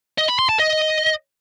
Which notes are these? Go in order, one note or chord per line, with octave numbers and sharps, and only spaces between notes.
D#5
B5
C6
A5
D#5